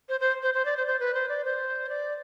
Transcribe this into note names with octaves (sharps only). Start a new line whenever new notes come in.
C5
C5
C5
C5
D5
C5
C5
B4
C5
D5
C5
D5